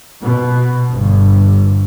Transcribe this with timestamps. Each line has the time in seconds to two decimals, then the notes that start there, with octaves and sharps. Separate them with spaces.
0.21 B2
0.90 G1